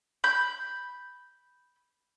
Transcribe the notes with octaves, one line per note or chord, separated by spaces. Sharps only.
B5 G6